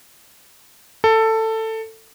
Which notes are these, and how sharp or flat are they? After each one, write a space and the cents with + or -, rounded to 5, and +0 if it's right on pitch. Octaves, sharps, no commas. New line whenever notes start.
A4 +15